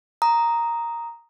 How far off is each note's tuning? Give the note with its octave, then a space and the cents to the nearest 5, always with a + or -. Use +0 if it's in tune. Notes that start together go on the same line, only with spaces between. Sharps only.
A#5 +0 D#6 +5